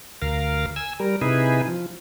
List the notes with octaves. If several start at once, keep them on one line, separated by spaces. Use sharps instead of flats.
D2 A#4 F5
G#5 E6
G3 A#4
C3 D#4 E4 G#4 B4
F3